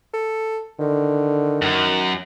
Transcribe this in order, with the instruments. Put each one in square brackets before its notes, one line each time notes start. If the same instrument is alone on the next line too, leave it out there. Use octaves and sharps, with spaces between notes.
[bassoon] A4
[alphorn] D3 [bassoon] D#3
[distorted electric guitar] F#2